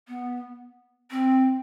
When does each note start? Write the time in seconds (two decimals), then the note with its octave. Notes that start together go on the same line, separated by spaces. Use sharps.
0.08 B3
1.11 C4